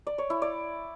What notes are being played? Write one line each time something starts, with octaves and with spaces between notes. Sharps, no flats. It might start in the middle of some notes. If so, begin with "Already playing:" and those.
D5
C#5
E4
D5